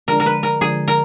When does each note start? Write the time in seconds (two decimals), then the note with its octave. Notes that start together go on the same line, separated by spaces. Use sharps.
0.08 D3 F3 G#3 D4 A#4
0.20 A#4
0.26 B4
0.43 A#4
0.61 D3 F3 G#3 D4 G#4
0.88 A#4